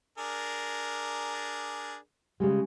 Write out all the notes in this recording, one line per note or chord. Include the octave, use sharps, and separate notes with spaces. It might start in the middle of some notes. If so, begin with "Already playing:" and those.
D4 G#4 A#4
C#3 G3 G#3